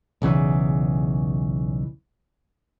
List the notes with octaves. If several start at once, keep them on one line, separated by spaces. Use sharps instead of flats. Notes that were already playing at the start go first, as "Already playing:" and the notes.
B1 E2 C#3 E3